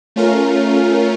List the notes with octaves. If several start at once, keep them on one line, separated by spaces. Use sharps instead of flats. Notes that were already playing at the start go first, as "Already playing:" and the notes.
A3 C#4 F4 A#4